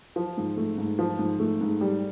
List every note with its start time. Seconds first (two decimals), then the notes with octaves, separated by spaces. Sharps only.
0.16 F3
0.38 G#2
0.57 A3
0.78 G#2
0.99 F3
1.19 G#2
1.39 A3
1.61 G#2
1.81 G3